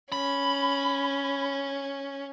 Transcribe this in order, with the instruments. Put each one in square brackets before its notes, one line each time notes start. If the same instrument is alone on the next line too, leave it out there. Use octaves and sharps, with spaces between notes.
[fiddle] C#4 [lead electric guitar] B5